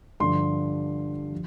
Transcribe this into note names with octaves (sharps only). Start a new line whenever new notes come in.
G2 D3 F3 C6
F3